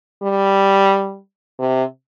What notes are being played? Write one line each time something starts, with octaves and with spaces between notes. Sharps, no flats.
G3
C3